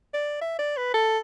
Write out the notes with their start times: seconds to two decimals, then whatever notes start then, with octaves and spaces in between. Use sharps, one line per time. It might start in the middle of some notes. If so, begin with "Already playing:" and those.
0.14 D5
0.41 E5
0.59 D5
0.77 B4
0.94 A4